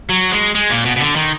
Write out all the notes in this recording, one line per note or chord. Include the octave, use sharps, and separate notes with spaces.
F#3
G#3
G#3
A#2
B2
B2
D3
D#3